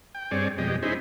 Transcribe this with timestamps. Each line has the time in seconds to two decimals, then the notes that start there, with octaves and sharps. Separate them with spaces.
0.15 G5
0.31 G2 C4 G#4 C#5 D5
0.58 F2 B2 G#3 G4 D#5
0.83 C#4 D#4 E4 G#4 C5 B5